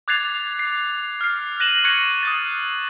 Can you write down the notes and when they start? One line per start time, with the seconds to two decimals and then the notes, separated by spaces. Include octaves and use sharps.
0.08 D6 F#6 G#6 A6 C7 F7
0.59 C7
1.21 F6 C7
1.60 F#6 A#6 D#7 E7 F#7
1.84 C#6 F#6 G#6 A#6 C#7 D#7
2.23 D#6 F#6 A6